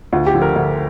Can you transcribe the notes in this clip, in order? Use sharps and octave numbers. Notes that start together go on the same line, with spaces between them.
D2 F4
G4
D3 F3
A#4
D2